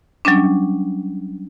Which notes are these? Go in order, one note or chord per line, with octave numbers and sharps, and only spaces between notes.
F#3 G3 C#4 D4